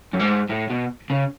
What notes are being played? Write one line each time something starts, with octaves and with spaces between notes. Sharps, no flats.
F#2
G#2
A2
B2
C#3